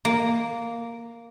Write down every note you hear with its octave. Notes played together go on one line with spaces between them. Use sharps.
A#3